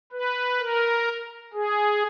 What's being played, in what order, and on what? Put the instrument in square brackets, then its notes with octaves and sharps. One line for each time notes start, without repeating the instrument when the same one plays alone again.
[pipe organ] B4
A#4
G#4